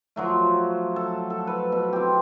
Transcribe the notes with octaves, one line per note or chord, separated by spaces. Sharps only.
F3 F#3 A3
A4
A4
B4
B2
C4 G4